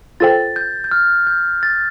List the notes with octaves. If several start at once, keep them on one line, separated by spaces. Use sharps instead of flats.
F4 A4 C5 G5 A6
G6
G6
F6
G6
A6